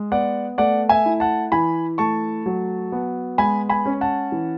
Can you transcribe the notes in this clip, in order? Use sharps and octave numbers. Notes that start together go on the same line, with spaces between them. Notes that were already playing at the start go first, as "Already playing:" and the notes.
Already playing: G#3
B3 D5 F#5
A3 D5 F#5
E5 G#5
E4
F#5 A5
E3 G#5 B5
A3 A5 C#6
F#3
B3
G#3 G#5 B5
G#5 B5
C#4
F#5 A5
E3